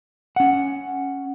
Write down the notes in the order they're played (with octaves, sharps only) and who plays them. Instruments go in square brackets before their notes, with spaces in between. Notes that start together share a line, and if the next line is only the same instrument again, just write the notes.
[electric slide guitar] C#4 F#5